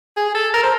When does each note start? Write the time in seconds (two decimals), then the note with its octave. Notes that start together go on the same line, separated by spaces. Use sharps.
0.17 G#4
0.35 A4
0.54 A#4
0.63 C5